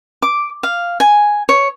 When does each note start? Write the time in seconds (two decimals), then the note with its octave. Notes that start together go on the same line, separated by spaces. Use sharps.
0.22 D6
0.63 F5
1.00 G#5
1.49 C#5